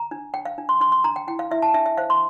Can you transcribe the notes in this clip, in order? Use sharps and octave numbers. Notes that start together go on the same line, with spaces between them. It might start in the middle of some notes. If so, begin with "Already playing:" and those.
Already playing: A#5
D4
D4 G5
F5
D4
C6
D4 C6
C6
D4 A#5
G5
E4 G5
F5
E4 E5
A5
D4 E5
E5
C5 F5
C6